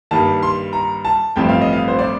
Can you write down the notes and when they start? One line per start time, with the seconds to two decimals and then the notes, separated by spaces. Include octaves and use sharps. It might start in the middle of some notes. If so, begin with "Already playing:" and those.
0.11 G2 D#3 G3 A#3 A5
0.42 C6
0.73 A#5
1.05 A5
1.36 A1 G2 F3 A3 C4 G5
1.49 F5
1.61 D#5
1.73 F5
1.88 C5
1.99 D5